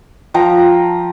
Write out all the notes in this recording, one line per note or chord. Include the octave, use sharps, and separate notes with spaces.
F3 G5 A#5